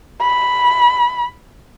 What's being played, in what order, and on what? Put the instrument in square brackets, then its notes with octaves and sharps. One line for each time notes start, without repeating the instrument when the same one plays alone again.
[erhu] B5